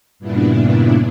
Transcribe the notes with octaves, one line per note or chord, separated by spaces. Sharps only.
G2 A#2 C#3 B3 D4 E4